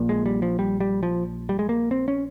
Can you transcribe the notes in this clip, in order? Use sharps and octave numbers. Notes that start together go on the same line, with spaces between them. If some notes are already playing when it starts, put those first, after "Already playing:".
Already playing: A#1 A#2
G#3
G3
F3
G3
G3
F3
G3
G#3
A#3
C4
C#4